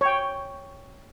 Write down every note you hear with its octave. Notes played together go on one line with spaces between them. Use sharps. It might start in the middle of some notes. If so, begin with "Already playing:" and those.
C#5 G5